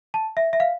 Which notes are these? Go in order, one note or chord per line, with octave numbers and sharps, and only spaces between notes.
A5
E5
E5
F5